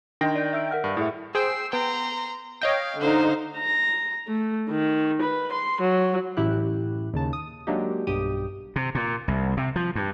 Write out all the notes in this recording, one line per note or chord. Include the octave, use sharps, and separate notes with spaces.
D#3 D4 D#5 G5 C6 A#6
D5 G6
E5 E6 D7
A#4 F#5 F6
G2
A2 E4 G#4 E5
G#4 C5 G5 E6 C7
B3 G5 A#5 C6
C#5 D#5 F5 G5
D3 D#4 C5 F5
A#5
A3
D#3
B4
C6
F#3
A1 F#2 E4 G4 F#6
D#2 C#3 A5
D#6
F#3 G#3 A#3 D4 D#4 G4
B1 G2 G4 D#6
C3
A#2
C2
C3
F3
G2